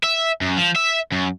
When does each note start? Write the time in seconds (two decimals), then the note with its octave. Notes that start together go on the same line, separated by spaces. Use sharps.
0.04 E5
0.42 F#2
0.58 F3
0.76 E5
1.12 F#2